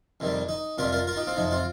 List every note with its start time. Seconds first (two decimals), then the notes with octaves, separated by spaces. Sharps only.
0.20 F2 C3 D#3 G3
0.49 D#4
0.78 F2 C3 G3 F4 A#4
0.92 F4 A#4
1.07 F4 A#4
1.17 D#4 G4
1.27 C4 F4
1.36 F2 C3 F3 D#4
1.51 C4 F4